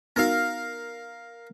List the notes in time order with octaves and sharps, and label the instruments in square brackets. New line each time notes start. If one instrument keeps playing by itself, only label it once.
[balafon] B3 D#4 F#4 [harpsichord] A#4 F5